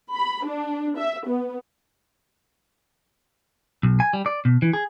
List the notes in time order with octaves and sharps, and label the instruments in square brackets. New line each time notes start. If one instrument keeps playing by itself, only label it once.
[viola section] B5
D4
E5
B3
[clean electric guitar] B1
G#5
G3
D5
B2
E3
G#4